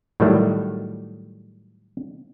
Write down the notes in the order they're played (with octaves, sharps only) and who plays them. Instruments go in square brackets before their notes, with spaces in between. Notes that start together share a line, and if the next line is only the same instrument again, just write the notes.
[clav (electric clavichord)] A2 D#3 F#3 G3 A3